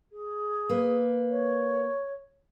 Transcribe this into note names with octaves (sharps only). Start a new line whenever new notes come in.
G#4
A#3 B4
C#5